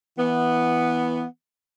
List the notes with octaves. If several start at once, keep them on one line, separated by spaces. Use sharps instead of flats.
E3 B3